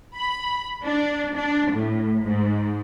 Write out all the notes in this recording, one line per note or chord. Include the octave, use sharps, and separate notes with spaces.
B5
D4
D4
A2
G#2